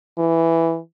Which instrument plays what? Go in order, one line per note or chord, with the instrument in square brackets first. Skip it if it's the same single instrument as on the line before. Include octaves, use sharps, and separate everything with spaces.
[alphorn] E3